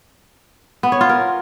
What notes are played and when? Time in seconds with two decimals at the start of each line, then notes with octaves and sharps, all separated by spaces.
0.83 B3
0.92 C#5
1.01 F4
1.09 A#4